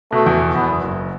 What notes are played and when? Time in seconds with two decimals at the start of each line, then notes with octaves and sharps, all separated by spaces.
0.12 B2 A3
0.26 E2
0.41 B2
0.55 E2 B3
0.69 F#1
0.84 F#1